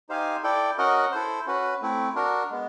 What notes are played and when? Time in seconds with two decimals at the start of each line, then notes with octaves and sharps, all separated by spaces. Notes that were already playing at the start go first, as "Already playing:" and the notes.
0.09 D#4 G4 C5 F5 G#5
0.43 E4 A4 D5 G5
0.78 C#4 F#4 A#4 D#5 F#5
1.12 E4 A4 C5
1.47 C#4 F#4 B4
1.82 A3 C4 E4
2.15 D4 F#4 A#4
2.50 G#3 B3